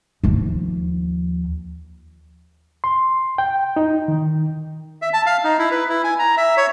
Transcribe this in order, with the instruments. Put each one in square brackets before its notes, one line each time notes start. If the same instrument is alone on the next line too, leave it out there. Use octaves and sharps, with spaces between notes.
[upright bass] D#2 F3
[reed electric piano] C6
G5
D#4
D#3
[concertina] E5
A5
F5
D#4
E4
B4
E4
G#5
A#5
E5
C#5